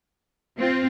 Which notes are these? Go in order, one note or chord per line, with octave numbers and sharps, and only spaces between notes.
C4 F4